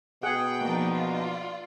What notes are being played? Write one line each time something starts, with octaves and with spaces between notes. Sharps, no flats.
B2 G#4 F#5 G5
F3 A#3 D4 D#4
F4
D5